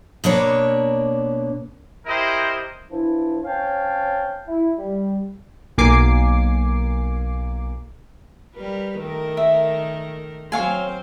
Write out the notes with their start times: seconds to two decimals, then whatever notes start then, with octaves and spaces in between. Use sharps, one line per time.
0.24 B2 A#3 D4 B4 C#5 A#5
2.06 E4 G4 A#4 C5 D#5
2.90 E3 F3 D4 E4
3.44 C4 C#4 C#5 F5 G5 A5
4.48 E4
4.78 G3
5.78 B1 A#3 G#5 D6 C7
8.54 G3 A#4 B4
8.98 D#3 A3 A#4
9.37 E5
10.52 F#3 C4 C5 C#5 F5 G#5